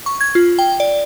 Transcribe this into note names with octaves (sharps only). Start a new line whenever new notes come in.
C#6
G#6
F4
G5
D5